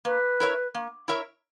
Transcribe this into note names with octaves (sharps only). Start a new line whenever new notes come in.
A#3 B4
E4 A#4 C#5 E5
A#3
E4 A#4 C#5 E5